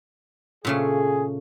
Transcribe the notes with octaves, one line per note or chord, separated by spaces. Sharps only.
A#2 C#3 A3 G#4